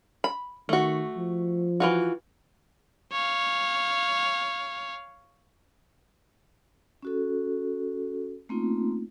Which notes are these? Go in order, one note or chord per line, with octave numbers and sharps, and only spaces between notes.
B5
D#3 A3 F#4
F3
E3 F4 F#4
C#5 F5
C#4 F#4 A4
A3 A#3 C4 C#4 D#4 F4